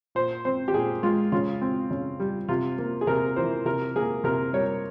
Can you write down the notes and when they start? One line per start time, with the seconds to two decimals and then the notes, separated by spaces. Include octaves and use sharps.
0.15 A#2 C5
0.45 C4 C5
0.68 G4
0.73 A#2 G#4
1.03 G#3 F4
1.32 C#3 F4
1.61 C4
1.91 C#3
2.20 G3
2.49 C3 F4
2.78 A#3
3.01 G#4
3.07 C3 A#4
3.36 E3 C5
3.65 C3 A#4
3.96 A#3 G#4
4.24 C3 A#4
4.53 G3 C#5